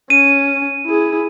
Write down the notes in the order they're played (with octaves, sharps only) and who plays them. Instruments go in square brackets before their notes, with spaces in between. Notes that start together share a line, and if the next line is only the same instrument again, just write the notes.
[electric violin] C#4 [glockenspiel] D#7
[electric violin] E4 G#4